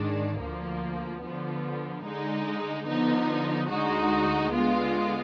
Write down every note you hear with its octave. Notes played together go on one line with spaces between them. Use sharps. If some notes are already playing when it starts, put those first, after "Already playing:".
Already playing: G#2 D#3 G#3 D4
D2 D3 F3 A#3
D3 F3 B3
D3 G#3 D#4
D3 F3 B3 D#4
D2 D3 G#3 D#4 F#4
D3 G#3 B3 F4